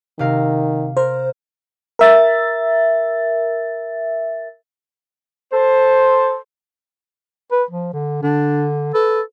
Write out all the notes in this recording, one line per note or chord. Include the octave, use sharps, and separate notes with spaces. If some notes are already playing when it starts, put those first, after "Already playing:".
C3 D#3 F5 A#6
A#4 C5
A#4 E5 A6
A4 C5
B4
F3
D3
D3 D4
A4 B4